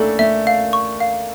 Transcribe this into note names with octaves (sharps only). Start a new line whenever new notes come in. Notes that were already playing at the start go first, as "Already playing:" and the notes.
Already playing: A3 A#3 C#4 D4 E4 A4
A3 E5
F5
C#6
F5